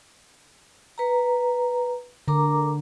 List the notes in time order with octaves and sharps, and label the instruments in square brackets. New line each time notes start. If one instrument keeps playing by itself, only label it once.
[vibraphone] B4 A#5
[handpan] D3 [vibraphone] A#4 A#5 D6